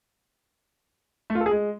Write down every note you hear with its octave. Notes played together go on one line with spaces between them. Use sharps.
A3
F4
A4
G#4
G#3